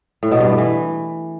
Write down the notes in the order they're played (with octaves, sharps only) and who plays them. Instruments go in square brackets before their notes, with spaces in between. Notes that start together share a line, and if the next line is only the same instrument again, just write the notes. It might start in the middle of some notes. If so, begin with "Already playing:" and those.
[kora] A2
B2
G2
A3
E3